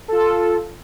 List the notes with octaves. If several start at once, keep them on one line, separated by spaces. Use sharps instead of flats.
F4 A4